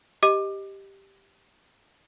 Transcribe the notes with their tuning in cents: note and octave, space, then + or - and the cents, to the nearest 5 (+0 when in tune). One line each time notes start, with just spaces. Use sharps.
G4 +0 D#5 +0 D6 +20